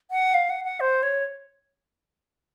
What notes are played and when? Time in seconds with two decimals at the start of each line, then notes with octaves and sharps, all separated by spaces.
0.11 F#5
0.34 F5
0.50 F#5
0.64 F#5
0.80 C5
1.03 C#5